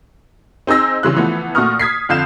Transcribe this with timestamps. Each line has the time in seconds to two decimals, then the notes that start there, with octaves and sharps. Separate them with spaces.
0.67 C4 D#4 G#4 E6 A#6
1.03 C#3 E3 G3 C6 F#6
1.16 E3 F3 A3 B3
1.55 A#2 A3 F#4 C#6 D#6 F6
1.79 D#6 G#6 B6 C7
2.09 F2 D3 F5 G6 E7